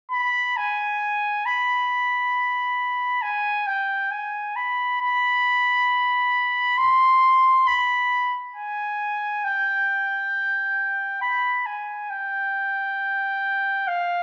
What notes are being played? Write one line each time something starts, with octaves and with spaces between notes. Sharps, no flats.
B5
G#5
B5
G#5
G5
G#5
B5
B5
C6
B5
G#5
G5
B5
G#5
G5
F5